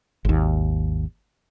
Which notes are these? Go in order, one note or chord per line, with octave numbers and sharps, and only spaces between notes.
G#1 D#2